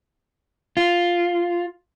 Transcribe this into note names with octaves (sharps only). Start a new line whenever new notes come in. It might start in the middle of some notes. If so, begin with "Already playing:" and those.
F4